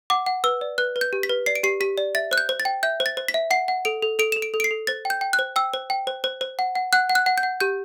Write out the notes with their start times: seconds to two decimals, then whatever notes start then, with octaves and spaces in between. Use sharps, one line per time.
0.10 F#5 D6
0.26 F#5
0.44 B4 E6
0.61 D5
0.78 B4 F#6
0.96 B4
1.01 G6
1.13 G4
1.23 B6
1.29 B4
1.46 D5 C7
1.56 D7
1.63 G4 C7
1.81 G4 B6
1.98 D5
2.15 E5 A6
2.31 C5 F#6
2.38 G6
2.49 C5
2.60 A6
2.65 G5
2.83 E5 G6
3.00 C5
3.06 A6
3.17 C5
3.28 B6
3.34 E5
3.51 F#5 C7
3.68 F#5
3.85 A4 D7
4.02 A4
4.19 A4 D7
4.32 A4 E7
4.42 D7
4.54 A4
4.60 D7
4.64 C7
4.71 A4
4.87 C5 A6
5.05 G5
5.10 G6
5.21 G5
5.33 F#6
5.39 C5
5.56 G5 E6
5.73 C5
5.90 G5
6.07 C5
6.24 C5
6.41 C5
6.59 F#5
6.75 F#5
6.93 F#5 F#6
7.09 F#5
7.15 F#6
7.26 F#5
7.38 G6
7.43 F#5
7.60 G4 G6